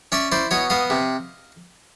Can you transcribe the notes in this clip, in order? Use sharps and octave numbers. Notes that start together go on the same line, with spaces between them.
C#4 D5 E5
E4 C5 D5
B2 C#5 D#5
B3 D#5 F5
C3